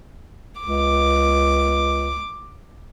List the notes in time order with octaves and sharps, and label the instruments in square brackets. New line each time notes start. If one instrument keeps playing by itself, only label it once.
[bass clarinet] C#2 [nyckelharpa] D6